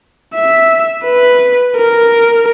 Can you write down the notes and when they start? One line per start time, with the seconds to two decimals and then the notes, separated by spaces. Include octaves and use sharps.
0.35 E5
1.05 B4
1.77 A#4